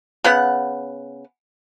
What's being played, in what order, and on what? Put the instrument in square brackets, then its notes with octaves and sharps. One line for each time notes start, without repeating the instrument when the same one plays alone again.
[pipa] C#3 B3 F#5